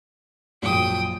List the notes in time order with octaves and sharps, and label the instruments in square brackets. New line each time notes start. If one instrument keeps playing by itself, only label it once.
[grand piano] A#1 F#2 F3 [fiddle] G5 D#6